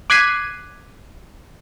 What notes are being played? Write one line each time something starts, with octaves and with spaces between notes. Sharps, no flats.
D6 F#6 G#6 B6 C7 D#7